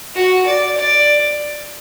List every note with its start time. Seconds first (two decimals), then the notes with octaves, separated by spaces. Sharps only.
0.15 F#4
0.46 D5
0.77 D5